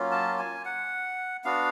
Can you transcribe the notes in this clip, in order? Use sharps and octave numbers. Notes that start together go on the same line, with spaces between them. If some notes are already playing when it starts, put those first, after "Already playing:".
Already playing: F#3 A#3 C#4 F4
A5
G#5
F#5
B3 D4 F#4 F5